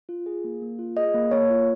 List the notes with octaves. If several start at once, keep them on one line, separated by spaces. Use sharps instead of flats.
F4
G#4
A#3
A#3
F4
G#4 D#5
A#3
A#3 C#5
F4